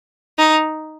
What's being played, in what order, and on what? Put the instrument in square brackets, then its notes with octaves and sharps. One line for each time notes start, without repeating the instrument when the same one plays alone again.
[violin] D#4